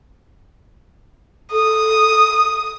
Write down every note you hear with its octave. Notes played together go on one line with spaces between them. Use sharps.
A4 D#6